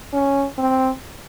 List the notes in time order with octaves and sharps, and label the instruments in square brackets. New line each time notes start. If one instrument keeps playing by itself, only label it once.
[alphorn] C#4
C4